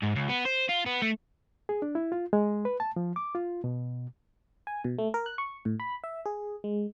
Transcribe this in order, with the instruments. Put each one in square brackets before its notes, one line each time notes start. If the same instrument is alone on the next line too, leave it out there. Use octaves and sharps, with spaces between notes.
[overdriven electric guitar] G#2
C#2
B3
C5
F4
B3
A3
[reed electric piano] G#4
D4
E4
F4
G#3
B4
A5
F3
D6
F4
B2
[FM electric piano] G#5
B2
A3
A#4
F#6
C#6
A2
B5
E5
G#4
G#3